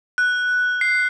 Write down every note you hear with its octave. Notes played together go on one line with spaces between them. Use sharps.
F#6
C7